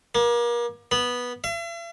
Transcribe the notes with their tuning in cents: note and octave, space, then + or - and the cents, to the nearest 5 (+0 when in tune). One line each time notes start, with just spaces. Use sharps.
A#3 +35
B3 -10
E5 +45